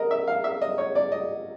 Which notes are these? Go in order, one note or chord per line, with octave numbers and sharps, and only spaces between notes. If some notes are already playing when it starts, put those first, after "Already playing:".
Already playing: A#4 D#5
E5
F5
E5
D#5
C#5
D5
D#5